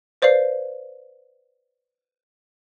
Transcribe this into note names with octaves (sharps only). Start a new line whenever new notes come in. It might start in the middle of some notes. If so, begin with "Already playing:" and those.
B4 C5 D5 F5 C7